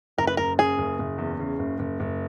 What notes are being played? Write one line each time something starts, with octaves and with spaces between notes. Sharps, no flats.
F#1 A#4
B4
F#1 A#4
C#3 G#4
F#1
F#1
E2
C#3
F#1
F#1
F#1